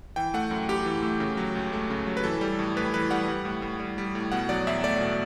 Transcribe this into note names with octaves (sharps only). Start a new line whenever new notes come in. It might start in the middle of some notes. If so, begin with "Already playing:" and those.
E3 G5
A3 F#5
F#2
F#2 G4
E3
A3
C#3
F#3
C#2
A3
C#3
F#3
B4
E3 A4
G3
A2
A2 B4
E3 B4
G3 F#5
G3
A2
A2
G3
G3
A2
B2 F#5
F#3 D5
E2 E5
A3 D5
B2